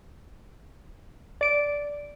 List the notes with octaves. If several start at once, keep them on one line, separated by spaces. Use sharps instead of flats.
D5 D7